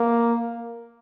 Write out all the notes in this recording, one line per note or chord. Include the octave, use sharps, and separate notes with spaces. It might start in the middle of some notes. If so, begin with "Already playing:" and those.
Already playing: A#3